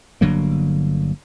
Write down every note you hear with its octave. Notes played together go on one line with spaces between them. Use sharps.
G1 D3 F#3 A#3